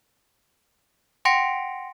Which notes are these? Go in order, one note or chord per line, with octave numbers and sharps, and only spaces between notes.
F#5 G5 C6 A#6 C#7 D7